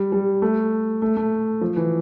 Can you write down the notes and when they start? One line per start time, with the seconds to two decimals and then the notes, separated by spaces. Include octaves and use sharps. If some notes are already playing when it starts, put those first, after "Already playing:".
Already playing: G3
0.12 G3
0.42 A3
1.02 A3
1.17 A3
1.61 F3
1.76 E3